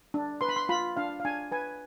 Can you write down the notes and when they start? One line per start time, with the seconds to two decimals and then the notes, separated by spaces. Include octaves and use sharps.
0.14 D4
0.41 B4 C6
0.49 B5
0.56 C6
0.69 F4 B5
0.97 D4 F5
1.20 F5
1.25 D4 G#5
1.52 B4 G#5